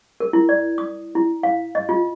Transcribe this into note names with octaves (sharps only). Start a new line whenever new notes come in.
A#4
E4
D5
D#6
E4
F5
D#5
F4